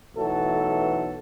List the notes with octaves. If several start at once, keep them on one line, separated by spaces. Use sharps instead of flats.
B1 E3 F#3 A3 A4